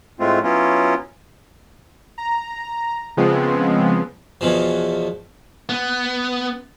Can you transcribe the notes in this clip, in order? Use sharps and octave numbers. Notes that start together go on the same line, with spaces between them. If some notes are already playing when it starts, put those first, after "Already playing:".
A2 G#3 A3 C4 F4
F#3 B3 C#4 E4 F4
A#5
C#3 F3 G#3 B3 C4
E2 B2 F3
B3